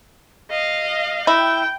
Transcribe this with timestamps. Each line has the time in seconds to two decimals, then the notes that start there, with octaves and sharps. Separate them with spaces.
0.51 D#5 F5
1.27 E4 G5